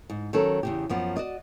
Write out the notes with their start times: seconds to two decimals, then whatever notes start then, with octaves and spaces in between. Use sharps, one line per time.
0.10 G#2
0.33 D#3 F#3 C#4 A4
0.63 E2 C#3 G4
0.89 F#2 F3 B3
1.17 F#4 D5 D#5